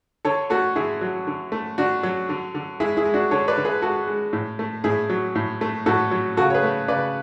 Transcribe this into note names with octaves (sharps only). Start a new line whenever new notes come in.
D3 A4 C#5
A3 F#4 A4
D3 E4 G#4
F#3
D3
A3
D3 D4 F#4
F#3
D3
D3
G#3 E4 G#4
E4 G#4
G#3
D4 F#4
D3 A4 C#5
B4 D5
D3
G#4 B4
G#3 F#4 A4
G#3
A2
A3
A2 E4 G#4
F#3
A2
A3
A2 F#4 A4
F#3
C#3 F#4 A4
C#5
G#4 B4
A3
C#3 B4 D5